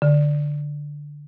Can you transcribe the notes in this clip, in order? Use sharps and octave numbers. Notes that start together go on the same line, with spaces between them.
D3